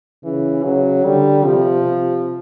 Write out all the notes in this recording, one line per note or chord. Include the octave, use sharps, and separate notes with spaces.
C#3 E3
C#3 F#3
D3 G3
C3 F3
C3